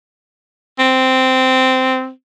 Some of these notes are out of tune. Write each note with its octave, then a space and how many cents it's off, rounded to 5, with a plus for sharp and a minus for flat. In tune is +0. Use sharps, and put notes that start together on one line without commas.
C4 -10